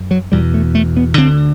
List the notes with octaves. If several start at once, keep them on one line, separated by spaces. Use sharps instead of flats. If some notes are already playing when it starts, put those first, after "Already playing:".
Already playing: F#2
F#3
E2 B2 G3
A3
A3
B3
D2 D3 C4